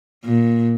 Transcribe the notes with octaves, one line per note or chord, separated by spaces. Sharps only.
A#2